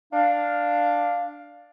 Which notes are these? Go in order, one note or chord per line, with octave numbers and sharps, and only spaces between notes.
D4 F5